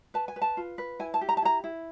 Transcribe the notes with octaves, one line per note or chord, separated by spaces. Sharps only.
B4 A5
G#5
B4
A5
F4
B4
E4 G#5
A5
G4
A#5
A5
E4 A#5
E4